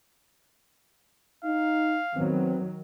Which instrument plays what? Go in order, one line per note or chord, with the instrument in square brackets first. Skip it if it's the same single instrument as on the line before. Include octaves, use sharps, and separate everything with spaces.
[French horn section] D#4 [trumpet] F5
[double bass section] D#3 F#3 [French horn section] B3 C4